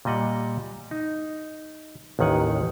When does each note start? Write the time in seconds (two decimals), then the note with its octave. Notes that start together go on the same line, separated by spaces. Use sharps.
0.05 A#2 G3 D#5 F#5
0.91 D#4
2.19 A1 D#2 D#3 F#5 G#5